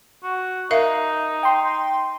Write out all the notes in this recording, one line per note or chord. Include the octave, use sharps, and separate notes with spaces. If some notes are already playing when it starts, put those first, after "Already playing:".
F#4
D#4 A#4 E5 F5
G5 C6